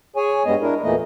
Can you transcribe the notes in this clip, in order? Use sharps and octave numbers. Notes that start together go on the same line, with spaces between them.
G#4 C#5 G#5
G2 G3 G#3 B3 D#5
D4 E4 A#4
E2 A#2 E3 A3 A#3 D#5